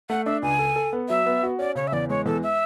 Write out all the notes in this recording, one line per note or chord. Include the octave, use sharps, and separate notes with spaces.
A3 F#5
D4 E5
C#2 G#5
A4
A4
B3
F#3 E5
B3
F#4
C#4 D5
C#3 C#5
E5
E2 D5
G#3 C#5
E2 A4
E5